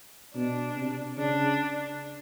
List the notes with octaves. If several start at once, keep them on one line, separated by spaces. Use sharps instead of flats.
B2 D4
C3
C#3 D4